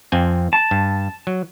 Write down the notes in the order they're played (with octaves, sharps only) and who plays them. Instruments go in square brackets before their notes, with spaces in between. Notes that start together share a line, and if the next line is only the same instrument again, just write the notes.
[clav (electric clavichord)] F2 C4 G#5
[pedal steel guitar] A5
[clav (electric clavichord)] G2
F#3